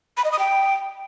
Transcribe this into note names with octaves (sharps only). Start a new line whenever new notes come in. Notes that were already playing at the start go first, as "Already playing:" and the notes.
B5
D#5
D#6
G5